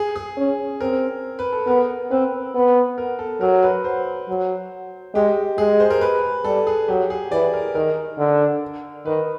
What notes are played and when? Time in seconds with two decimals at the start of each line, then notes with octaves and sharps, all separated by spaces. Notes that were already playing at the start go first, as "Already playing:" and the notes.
Already playing: G#4
0.16 G#4
0.37 C#4
0.81 C4 A#4
1.39 B4
1.53 A4
1.67 B3 A#4
2.11 C4 B4
2.54 B3
2.98 A#4
3.19 A4
3.41 F#3 A#4
3.63 B4
3.84 C5
4.29 F#3
5.14 G#3 G4
5.58 G#3 G#4
5.80 C5
5.91 A#4
6.01 B4
6.45 G3 A4
6.67 G#4
6.88 F#3 G4
7.10 G#4
7.31 E3 D5
7.53 A#4
7.75 D#3 A#4
8.18 D3
9.05 D#3 B4